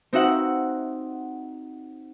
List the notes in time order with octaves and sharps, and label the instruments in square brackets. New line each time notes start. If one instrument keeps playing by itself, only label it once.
[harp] C4 D#4 F#4 E5 F#5